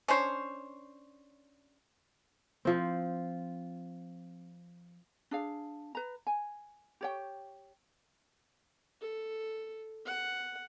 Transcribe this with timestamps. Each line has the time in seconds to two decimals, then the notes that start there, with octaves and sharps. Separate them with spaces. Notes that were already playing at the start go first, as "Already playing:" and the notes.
0.08 C#4 D4 C5 C#5
2.65 F3 C4
5.31 D4 G#4 F5
5.95 B4 A#5
6.27 G#5
7.01 G4 C#5 G5
9.01 A4
10.06 F#5